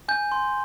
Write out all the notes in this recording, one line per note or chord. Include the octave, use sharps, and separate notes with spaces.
G#5 G6
C6